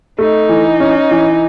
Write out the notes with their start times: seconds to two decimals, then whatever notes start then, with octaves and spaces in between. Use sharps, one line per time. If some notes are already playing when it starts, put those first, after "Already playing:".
0.18 A3 D#4
0.49 E3
0.80 C#4
1.11 E3